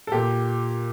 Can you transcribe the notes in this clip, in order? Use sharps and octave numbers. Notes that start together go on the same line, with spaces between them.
A4
A#2 G4